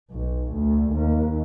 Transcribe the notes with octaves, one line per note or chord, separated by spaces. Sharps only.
B1
D2
D#2